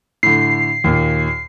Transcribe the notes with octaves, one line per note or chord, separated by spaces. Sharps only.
A2 D3 C7
D#2 A#2